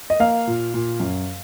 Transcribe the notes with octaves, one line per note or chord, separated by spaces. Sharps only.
D#5
A#3 F5
A#2
A#2
F#2